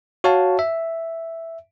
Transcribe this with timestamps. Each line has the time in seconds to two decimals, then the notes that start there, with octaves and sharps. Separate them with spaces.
0.24 F#4 C#5 F5 A5
0.59 E5